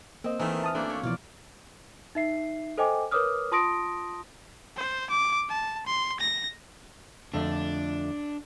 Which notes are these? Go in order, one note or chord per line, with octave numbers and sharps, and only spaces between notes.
A#3 C4 D#5
D#3 E3 A3 A#4
A5 D#6 F6
F#2 A3 A#3 D4 C5
C#5
B2 E3 F3 F4 D5
D#4 E5 C7
A4 C5 D#5 G5 G#5 D6
A#4 B4 C#5 D6 D#6 F6
F4 A5 C6 D#6 A#6 D7
C5
D6
A5
C6
A#6
F2 D3 A3 D4